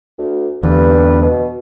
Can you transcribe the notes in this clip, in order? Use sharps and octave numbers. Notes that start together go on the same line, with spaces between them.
D2
E2 G2 D3 B4
B2